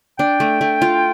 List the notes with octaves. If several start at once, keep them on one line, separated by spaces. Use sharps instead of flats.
D4 G5
A3
A3
F4